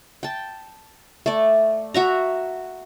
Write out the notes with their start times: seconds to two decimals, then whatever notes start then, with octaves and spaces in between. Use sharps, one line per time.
0.23 G5 A5
1.26 A3 D5
1.94 F#4 E5 A#5